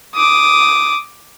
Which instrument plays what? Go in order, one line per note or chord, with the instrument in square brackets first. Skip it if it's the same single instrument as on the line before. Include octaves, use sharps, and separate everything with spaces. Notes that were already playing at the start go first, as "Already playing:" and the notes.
[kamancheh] D6 D#6